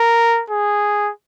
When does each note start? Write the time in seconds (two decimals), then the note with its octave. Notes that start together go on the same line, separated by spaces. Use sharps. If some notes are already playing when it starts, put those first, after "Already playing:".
Already playing: A#4
0.50 G#4